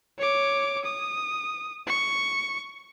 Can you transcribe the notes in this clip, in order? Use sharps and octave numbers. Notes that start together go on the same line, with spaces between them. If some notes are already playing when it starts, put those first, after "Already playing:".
C#5 D6
D#6
C#6